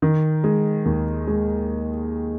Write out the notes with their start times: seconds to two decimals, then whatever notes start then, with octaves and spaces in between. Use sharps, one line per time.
0.02 D#3
0.44 G#3
0.85 D#2
1.27 G#3